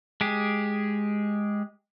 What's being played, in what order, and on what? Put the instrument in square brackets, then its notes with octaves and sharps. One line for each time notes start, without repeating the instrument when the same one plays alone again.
[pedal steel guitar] G#3 G4 G#4